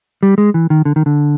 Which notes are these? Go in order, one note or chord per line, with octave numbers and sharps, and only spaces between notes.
G3
G#3
E3
D#3
D3
D#3
D3